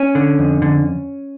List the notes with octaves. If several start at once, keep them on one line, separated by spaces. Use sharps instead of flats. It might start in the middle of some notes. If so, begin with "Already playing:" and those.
Already playing: C#4
D3
F2
D3